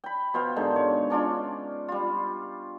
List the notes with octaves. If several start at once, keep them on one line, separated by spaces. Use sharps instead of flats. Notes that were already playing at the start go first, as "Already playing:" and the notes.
G5 B5
B2 C5 F5 G5
G#2 D3 D#3 G#3
C#5
C#4 D4 F4
G3 F4